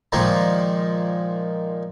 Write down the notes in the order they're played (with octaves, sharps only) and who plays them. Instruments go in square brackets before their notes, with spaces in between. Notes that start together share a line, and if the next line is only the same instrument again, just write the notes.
[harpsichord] A#2 D#3 F3 G#3 A#3